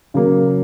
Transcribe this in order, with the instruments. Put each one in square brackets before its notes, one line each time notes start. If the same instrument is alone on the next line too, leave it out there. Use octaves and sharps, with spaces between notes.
[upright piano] C#3 F#3 A#3